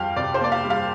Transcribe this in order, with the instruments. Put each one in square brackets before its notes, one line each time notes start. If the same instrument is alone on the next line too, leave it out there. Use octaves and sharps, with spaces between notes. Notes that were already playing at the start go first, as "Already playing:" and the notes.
Already playing: [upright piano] F2 G3 F5 G5
C3 D5
C5
A#3 D5
F5
G3
F5